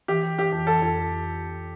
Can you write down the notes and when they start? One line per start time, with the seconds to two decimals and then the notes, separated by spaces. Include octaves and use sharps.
0.08 E3 G4
0.23 E3
0.39 E3 G4
0.53 F2
0.67 E3 A4
0.82 F2